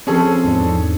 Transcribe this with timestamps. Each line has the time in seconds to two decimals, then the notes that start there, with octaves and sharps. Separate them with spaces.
0.07 F3 C4 C#4 G#4 A4
0.44 E2 G#2 D4